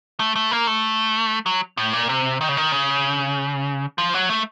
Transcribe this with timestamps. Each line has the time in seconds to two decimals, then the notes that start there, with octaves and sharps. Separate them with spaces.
0.20 A3
0.36 A3
0.51 A#3
0.67 A3
1.46 F#3
1.77 A2
1.93 A#2
2.09 C3
2.41 D#3
2.49 C#3
2.57 D#3
2.72 C#3
3.98 F3
4.14 F#3
4.30 A3